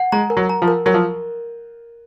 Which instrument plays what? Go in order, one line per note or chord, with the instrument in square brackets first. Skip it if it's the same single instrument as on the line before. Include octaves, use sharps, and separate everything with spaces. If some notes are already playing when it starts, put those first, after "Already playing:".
Already playing: [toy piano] F#5
[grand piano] G#3 [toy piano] A#5
[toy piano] A#4
[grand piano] F#3
[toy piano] A#5
[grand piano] F3
[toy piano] A#4
[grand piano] F#3 [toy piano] A#4
[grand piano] F3